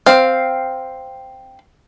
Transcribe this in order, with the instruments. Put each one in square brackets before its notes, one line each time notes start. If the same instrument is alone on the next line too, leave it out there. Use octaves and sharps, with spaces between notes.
[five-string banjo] C4 F5